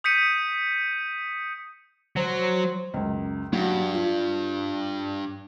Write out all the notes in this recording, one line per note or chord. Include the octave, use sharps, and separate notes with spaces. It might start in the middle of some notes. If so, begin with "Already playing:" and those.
D#6 G6 B6 C#7 D#7
F#3 C5
C#2 F#2
G2 F#3
F4